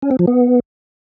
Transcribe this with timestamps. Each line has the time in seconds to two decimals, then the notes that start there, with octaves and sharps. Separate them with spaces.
0.02 C#4
0.11 C4
0.19 F3
0.27 B3